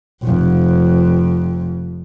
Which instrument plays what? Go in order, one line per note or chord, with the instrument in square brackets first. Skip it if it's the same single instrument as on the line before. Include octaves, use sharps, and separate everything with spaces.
[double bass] F1 F2